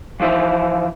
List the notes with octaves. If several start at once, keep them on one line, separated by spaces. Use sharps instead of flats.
E3 F3 E4 C5 E5